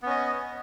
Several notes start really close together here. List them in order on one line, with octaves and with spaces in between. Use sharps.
B3 C#4 D#5